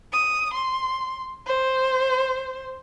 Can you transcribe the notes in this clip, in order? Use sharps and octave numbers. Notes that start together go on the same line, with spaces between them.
D#6
C6
C5